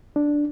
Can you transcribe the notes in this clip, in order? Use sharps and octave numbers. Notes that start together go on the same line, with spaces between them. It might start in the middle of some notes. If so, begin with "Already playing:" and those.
D4